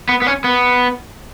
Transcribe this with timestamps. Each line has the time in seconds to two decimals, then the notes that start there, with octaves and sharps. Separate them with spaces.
0.09 B3
0.22 B3
0.27 C#4
0.44 B3